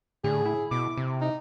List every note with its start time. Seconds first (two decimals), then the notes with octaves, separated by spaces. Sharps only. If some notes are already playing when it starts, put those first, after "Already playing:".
0.24 A2 D3 G#4
0.45 E4
0.71 B2 D6
0.97 C3
1.21 D#4